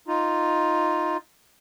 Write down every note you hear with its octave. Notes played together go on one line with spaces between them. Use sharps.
D#4 F4